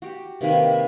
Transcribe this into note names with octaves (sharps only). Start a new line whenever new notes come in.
F#4 G4
C3 D#3 A#3 B4
E5